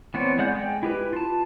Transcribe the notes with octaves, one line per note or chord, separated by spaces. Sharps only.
E3 B3 C4 C#5 D5
G#3 D5 F#5 G6
G#3 G5
E4 G4 B4
F4 A5